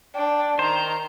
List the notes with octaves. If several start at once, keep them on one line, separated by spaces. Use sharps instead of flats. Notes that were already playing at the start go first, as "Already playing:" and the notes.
D4 G5
D#3 C5 A#5